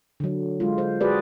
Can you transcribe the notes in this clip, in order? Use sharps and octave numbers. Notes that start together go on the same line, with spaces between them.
D3 F#3
G#3 F4
C5
F#4 G#4 B4 D5